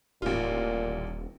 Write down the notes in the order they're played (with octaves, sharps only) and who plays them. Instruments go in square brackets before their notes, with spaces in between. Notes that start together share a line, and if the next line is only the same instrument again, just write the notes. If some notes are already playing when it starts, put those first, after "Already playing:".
[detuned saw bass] D#1 [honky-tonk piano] A1 F4 [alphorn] A#2